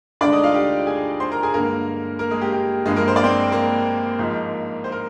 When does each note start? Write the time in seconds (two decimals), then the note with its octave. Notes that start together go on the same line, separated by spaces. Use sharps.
0.21 D2 D3 G#3 D4 D5
0.32 D#4 D#5
0.43 F4 F5
0.54 G4 G5
0.87 G#4 G#5
1.20 C5 C6
1.32 A#4 A#5
1.43 G#4 G#5
1.54 G2 D3 G#3 A#3 A#4
2.19 A#3 A#4
2.31 G#3 G#4
2.41 G4
2.52 G4
2.85 G1 G2 F3 G#3 A#3 G#4
2.96 A#3 A#4
3.08 C5
3.16 D5
3.23 C4 C5
3.51 A#3 A#4
4.19 G#1 G#2 F3 G#3
4.84 C5
4.92 A#4